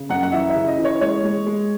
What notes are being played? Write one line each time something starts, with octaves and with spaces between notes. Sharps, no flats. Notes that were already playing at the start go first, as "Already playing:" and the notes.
Already playing: C#3
F#2 F#5
F#5
E3 E5
E5
C#3
D#5
E3
C#5
G#3 C#5
G#3
G#3